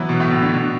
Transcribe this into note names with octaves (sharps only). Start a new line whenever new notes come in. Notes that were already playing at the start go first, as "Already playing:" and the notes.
Already playing: E3 F#3 B3
B2
A2
B2
D3
B2